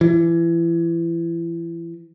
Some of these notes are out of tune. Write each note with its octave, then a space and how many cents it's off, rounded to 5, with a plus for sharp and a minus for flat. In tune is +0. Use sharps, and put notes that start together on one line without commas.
E3 +30